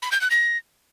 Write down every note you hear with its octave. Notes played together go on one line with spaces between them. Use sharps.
B5
G6
F#6
A#6